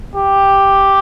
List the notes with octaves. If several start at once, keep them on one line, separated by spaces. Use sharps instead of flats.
G4